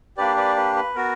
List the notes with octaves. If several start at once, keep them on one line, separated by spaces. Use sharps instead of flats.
A#3 D4 G4 B4 D5
B4 D5
B4
B4
B3 F#4 A#4